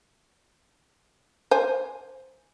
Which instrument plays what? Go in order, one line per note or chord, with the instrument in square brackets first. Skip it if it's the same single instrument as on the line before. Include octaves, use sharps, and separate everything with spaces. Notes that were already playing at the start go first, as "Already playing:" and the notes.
[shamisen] C5 G#5